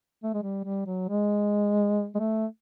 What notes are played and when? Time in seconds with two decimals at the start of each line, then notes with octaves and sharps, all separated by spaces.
0.24 A3
0.34 G#3
0.42 G3
0.65 G3
0.86 F#3
1.09 G#3
2.15 G#3
2.19 A3